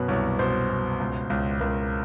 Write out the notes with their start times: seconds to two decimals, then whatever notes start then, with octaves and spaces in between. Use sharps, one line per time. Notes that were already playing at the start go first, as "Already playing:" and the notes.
Already playing: F#2 B2 B4
0.08 C2 C#5
0.39 B2 C5
0.70 B2
1.00 C#2
1.30 C#2
1.60 C#2 A#4